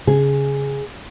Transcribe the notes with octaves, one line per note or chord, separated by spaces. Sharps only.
C#3 G#4